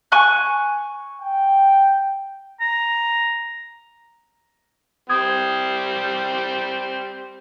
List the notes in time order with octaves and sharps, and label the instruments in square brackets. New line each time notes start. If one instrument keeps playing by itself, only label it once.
[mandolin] G#5 C#6 F#6
[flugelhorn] G5
[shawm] A#5
[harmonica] G3 C4 [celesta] D#6 G#6